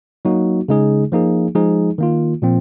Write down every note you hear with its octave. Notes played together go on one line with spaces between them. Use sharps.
F#3 A#3 D#4 F#4
C#3 G#3 D#4 G#4
F3 A#3 D#4 G#4
F3 G#3 D#4 G#4
D#3 A#3 F4
A#2 F3 C4